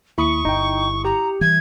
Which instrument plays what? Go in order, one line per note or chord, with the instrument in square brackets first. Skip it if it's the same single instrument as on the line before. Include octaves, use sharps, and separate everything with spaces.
[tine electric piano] D#2 B5 [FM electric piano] E4 D#6 C#7 [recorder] C#6
[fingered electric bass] G1 [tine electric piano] D#4 G5
[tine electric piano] G4 [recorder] A#5
[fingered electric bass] E3 G3 [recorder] G#6